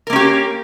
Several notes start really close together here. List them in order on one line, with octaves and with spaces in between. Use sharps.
A#4 A#3 C#4 G4